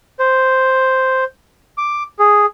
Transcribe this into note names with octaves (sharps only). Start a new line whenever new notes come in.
C5
D6
G#4